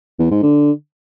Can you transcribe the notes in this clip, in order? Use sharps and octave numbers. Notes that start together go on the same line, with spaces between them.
E2
G#2
D3